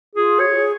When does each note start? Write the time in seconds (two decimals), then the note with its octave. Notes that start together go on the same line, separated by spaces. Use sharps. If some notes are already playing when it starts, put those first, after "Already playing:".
0.15 F4 G#4
0.39 F#4 C#5
0.50 F#4
0.55 G#4